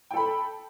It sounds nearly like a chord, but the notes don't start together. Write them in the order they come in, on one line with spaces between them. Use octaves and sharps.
G5 A4 B5